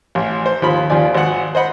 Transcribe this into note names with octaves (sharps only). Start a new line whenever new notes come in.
A1
C5
D#2 F3 B5
D#2 F3 C4 D5 G#5
G#1 F#5
C5 D#5 F#5 B5